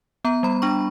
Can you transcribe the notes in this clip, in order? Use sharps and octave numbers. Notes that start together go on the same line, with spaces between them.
B3 A#5
G3 B5
D4 C#6